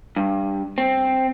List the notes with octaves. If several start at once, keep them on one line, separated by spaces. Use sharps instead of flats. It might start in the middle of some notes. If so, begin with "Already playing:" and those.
G2
C4